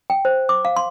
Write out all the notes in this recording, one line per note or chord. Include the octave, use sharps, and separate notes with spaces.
G5
C5
D6
F5
C6